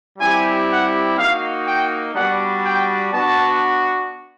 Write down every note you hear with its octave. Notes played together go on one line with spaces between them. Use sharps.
G3 C4 E4 G4 G#5
F#5
A#3 D#4 F#4 F5
G5
G3 B3 D4 F#4 F#5
G5
B3 D4 F#4 A5